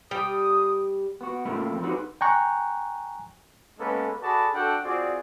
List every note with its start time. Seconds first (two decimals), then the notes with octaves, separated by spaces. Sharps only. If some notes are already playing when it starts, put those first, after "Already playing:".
0.11 G3 G5 D#6
1.21 B3 F#4
1.45 A2 C#3 A3 A#3 E4 F4
1.72 F2 C4
1.84 D#4 F#4 G#4 B4
2.21 G5 G#5 A#5 C#6 F#6
3.80 G#3 A#3 B3 C#4 A4 B4
4.23 F#4 G#4 A4 D5 A5 B5
4.54 D4 F#4 A4 F#5 G5
4.84 C4 F4 F#4 G#4 D5